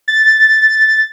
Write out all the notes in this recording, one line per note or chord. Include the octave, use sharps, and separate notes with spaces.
A6